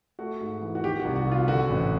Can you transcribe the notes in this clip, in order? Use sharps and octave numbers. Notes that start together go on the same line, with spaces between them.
A3 F#4
G#2
E3
F#4
D#3 G4
F#4
C2
F#4
C3
F4
D3 F#4
A1